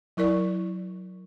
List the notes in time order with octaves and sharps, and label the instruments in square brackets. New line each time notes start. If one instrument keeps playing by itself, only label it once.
[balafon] F#3 E4 A#4 D5 C#6